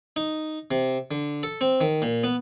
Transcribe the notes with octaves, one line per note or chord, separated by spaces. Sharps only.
D#4
C3
D3
A4
C4
D#3
A#2
B3